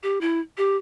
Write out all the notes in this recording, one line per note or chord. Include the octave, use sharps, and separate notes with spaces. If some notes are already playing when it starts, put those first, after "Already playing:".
G4
E4
G4